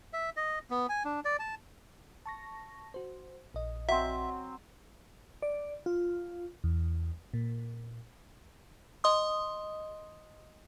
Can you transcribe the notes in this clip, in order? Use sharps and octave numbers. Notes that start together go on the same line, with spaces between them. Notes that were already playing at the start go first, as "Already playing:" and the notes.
E5
D#5
B3
G#5
D4
D5
A5
A5 C#6 A#6
F#4 C5
A#1 D#5
F#3 C4 E5
D5
F4
E2
A#2
D#5 C6 D#6